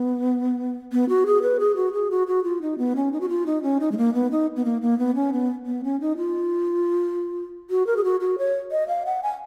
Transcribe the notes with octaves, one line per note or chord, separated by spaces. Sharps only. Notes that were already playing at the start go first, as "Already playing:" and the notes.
Already playing: B3
B3
F#4
G#4
B4
G#4
F#4
G#4
F#4
F#4
F4
D#4
B3
C#4
D#4
F#4
F4
D#4
C#4
D#4
G#3
A#3
B3
D#4
B3
A#3
A#3
B3
C#4
B3
B3
C#4
D#4
F4
F#4
A#4
G#4
F#4
F#4
C#5
D#5
F5
F#5
G#5